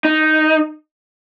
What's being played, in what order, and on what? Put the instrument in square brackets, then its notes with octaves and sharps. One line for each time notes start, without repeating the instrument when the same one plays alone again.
[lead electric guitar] D#4